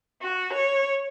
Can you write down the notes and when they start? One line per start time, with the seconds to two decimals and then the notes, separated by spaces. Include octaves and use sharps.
0.21 F#4
0.53 C#5